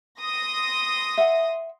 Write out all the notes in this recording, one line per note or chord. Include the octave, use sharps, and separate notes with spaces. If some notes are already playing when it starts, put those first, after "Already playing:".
C6 D#6 A#6
E5 F#5